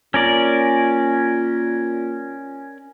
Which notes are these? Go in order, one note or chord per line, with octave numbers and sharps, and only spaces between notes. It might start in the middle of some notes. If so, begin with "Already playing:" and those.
A#2 C#4 A#4 D5